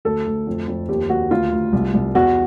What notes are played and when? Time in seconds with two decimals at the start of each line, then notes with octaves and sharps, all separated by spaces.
0.05 D2 A4
0.26 D2
0.47 F2
0.68 F2
0.89 D#2 G4
1.10 D#2 F#4
1.31 D2 F4
1.52 D2
1.73 C2
1.94 C2
2.15 E2 F#4